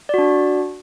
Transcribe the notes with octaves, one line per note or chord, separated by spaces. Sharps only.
D4 F#4 D5